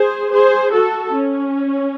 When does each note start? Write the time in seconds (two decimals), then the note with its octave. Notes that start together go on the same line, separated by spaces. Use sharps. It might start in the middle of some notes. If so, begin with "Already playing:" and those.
Already playing: G#4 C5
0.33 G#4 C5
0.73 F#4 A4
1.15 C#4